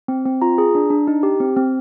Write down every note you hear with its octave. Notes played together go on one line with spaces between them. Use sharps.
C4
C4
F4 A#5
G#4
D4
D4
D#4
G4
C4
C4